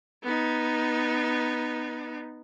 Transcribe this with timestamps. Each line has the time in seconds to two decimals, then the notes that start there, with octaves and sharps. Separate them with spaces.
0.23 B3 D#4